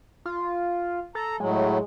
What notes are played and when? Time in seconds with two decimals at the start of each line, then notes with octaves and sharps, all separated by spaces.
0.25 F4
1.15 A4 A#5
1.40 A2 F#3 G#3